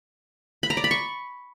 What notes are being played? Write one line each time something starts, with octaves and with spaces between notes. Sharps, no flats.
B5
A#5
D5
B5
C#6